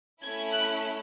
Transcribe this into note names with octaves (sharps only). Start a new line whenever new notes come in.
A3 C#4 E4 G#6
F#6